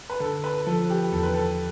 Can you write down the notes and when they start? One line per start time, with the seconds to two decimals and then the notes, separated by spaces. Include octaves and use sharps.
0.10 B4
0.20 D3 A4
0.44 B4
0.66 F3 A4
0.90 G4
1.13 E2 A4
1.23 B4
1.34 A4